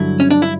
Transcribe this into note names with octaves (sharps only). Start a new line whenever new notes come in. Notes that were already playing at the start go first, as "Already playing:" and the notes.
Already playing: G2 D3 F#3 E4
C#4
D4
E4